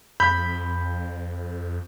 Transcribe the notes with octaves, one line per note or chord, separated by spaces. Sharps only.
F2 B5 G6